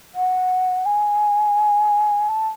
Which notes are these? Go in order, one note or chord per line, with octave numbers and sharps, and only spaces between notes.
F#5
G#5
A5